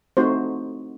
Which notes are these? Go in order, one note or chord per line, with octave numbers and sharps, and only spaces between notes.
A3 C4 D#4 F#4 C5